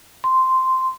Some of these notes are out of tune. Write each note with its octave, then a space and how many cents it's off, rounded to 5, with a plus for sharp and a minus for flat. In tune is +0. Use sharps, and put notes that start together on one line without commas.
C6 -5